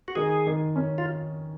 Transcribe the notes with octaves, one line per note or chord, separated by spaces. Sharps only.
F#4
D#3 G#4
D#3
C#4
F4